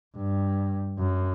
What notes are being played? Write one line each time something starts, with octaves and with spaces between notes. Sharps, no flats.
G2
F#2